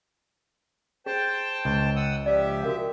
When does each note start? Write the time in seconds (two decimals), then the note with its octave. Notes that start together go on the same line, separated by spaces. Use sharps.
1.06 G#4 C5 G5 A5
1.65 C#2
1.96 F#5 D#6 E6
2.26 F3 G4 D5 E5
2.63 F#4 A#4 F5